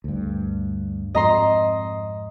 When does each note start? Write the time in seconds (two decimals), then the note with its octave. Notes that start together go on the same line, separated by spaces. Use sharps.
0.04 D2 G2
1.15 F2 G#2 C4 D#5 A#5 C6